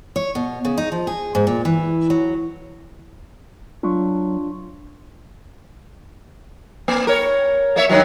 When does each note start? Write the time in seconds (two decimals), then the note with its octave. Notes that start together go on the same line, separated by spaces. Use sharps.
0.16 C#5
0.35 B2
0.65 C#3
0.77 D#4
0.92 F3
1.07 G#4
1.35 G#2
1.47 A#2
1.65 E3
2.10 F#3
3.83 F#3 D4 F4 C#6
6.88 A#3
7.07 A#4 C#5
7.76 A#3 C#5 E5
7.89 G2 D#3 F#3